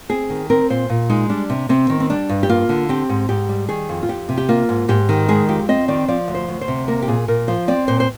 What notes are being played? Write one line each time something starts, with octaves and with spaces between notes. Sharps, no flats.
C4 G#4
D#3
C4 A#4
A#2 C5
A#2
G#3 D#4
G3 D4
C3
C3 C4
D#3
C4
G3 D4
G2
G4
A#3 F4
D3
C4 G4
G#2
G#2 G4
G3
D#3 G#4
F2
F4
F2 G4
C3
G4
A#3 F4
G#2
G#2 G4
D#3
G#3 G#4
F2 G4
C4 D#5
D#3 D5
F3 D5
D2
C5
D2
C5
C3
A#3 A#4
G4
A#2 G#4
A#2 A#4
F3 C5
C4 D5
A#2 C5
C5